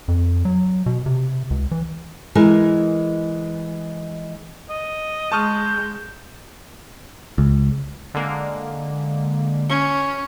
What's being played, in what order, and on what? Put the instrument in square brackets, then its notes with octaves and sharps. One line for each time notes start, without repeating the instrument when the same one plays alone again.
[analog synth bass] F2
F#3
B2
C3
C#2
E3
[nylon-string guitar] E3 G#3 A#4 G#5
[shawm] D#5
[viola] G#3 [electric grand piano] A5 C#6 F6 [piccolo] G6
[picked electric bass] C#2
[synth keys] D3 G#3 A#3
[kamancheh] C#4 [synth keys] C#7